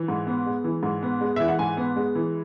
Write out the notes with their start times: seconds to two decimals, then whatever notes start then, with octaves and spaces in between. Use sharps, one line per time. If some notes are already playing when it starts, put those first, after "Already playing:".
Already playing: E3
0.08 G#2
0.27 B3
0.46 G#3
0.64 E3
0.83 G#2
1.03 B3
1.21 G#3
1.36 E3 E5
1.48 F#5
1.59 G#2 G#5
1.77 B3
1.96 G#3
2.15 E3